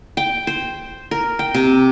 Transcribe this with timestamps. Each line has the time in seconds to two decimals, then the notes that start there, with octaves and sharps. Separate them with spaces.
0.17 G5
0.47 C5
1.11 A#4
1.39 G5
1.54 C3